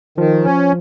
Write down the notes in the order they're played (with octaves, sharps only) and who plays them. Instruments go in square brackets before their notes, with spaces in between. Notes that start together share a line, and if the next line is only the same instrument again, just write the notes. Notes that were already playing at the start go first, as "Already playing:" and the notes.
[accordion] D#3 [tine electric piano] F3
[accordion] C#4